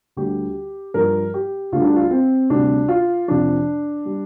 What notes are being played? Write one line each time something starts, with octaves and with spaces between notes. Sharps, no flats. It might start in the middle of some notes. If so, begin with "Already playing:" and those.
D2 D3 G3 G4
G2 F3 A#4
G4
D2 D3 G3 F4
D4
F4
C4
D2 C3 G3 D4
F4
F2 C3 F3 D4
G3